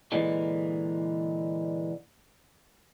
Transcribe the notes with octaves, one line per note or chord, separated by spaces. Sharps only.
A#2 D3 E3 G#3